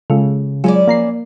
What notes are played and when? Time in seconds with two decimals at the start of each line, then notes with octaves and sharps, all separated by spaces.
0.10 C#3 G#3 F4 A4
0.64 F#3 G#3 C#4 E4 F4 G#4 D5
0.87 F3 A#3 A#5 C7